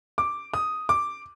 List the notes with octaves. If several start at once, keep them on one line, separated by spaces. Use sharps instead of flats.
D6
D#6
D6